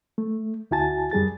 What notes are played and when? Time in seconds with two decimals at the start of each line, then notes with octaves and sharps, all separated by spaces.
0.18 A3
0.71 D2 E4 F#4 G#5 A5 A6
1.11 F#2 G3 G#4 A6